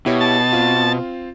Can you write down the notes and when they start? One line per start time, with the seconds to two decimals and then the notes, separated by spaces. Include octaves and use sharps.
0.06 B2 E4 G4 C#5
0.20 A5
0.53 C4 F4